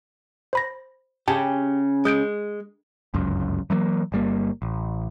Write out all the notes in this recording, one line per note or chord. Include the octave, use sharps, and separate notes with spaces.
C5 B5 A#6
C#3 G4 G5 A5
G#3 D#6 G6 D7
G1 C#2 F#2
E3 F#3 A3 A#3
G1 G3 A#3
A1